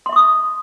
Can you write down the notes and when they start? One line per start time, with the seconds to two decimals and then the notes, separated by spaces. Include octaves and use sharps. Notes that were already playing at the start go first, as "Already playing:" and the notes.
0.06 C6
0.09 E5
0.13 C#6
0.16 D#6